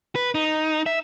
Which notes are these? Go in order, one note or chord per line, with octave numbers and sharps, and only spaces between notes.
B4
D#4
E5